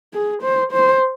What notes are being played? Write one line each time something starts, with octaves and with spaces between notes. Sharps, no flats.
G#4
C5
C5